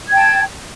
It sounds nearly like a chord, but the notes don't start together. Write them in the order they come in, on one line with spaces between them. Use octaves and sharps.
G#6 G5 A5